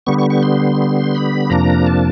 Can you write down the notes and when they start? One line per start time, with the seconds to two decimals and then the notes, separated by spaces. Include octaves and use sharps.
0.07 D3 G3 B3 C#6
0.18 C#6
0.30 C#6
0.43 C6
1.15 B5
1.50 F2 C3 F3 A#3 D4 A#5
1.86 A5